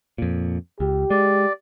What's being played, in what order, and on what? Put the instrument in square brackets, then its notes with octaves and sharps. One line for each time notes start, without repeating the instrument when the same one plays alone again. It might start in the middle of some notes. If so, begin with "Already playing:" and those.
[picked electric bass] F2 A#2
[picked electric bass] C#2 [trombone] G4
[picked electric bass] G#3 [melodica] D5